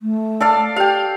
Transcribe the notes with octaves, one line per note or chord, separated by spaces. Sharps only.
A3
A4 D5 F5
G4 F5 G5